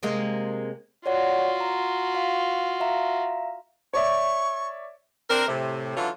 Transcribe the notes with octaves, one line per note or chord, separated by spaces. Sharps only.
C3 G#3 A#3
F4 F#4 C#5 D5 F#5
A#5
F5
E5 F5 A#5
C#5 D5 E5 C#6
C4 D4 A#4
A2 C3
D3 E3 F#3 C#4 F4